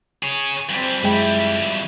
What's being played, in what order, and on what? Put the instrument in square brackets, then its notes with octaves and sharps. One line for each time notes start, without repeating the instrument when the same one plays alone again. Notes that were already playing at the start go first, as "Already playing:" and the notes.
[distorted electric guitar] G#4 C#5
[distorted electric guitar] F2 G3 [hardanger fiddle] C4 G#5
[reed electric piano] F#2 G#3 G5 [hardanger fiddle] E4